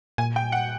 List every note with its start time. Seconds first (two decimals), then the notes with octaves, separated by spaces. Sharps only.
0.18 A#2 G#5
0.36 G5
0.52 F#5